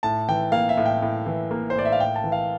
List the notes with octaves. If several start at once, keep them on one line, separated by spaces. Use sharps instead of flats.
A2 A5
E3 G5
A#3 F5
E5
A2
G5
A2
E3
A#3
C5
A2 D5
E5
F5
A2 G5
A5
E3
F5